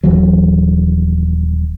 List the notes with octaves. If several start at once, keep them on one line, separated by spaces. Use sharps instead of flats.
D#1 C2 E3 F#3